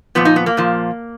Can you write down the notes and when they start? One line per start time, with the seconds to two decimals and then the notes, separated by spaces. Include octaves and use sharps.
0.15 A#2 F3 B3
0.25 D#4
0.36 B3
0.46 A#3
0.57 A#2 F3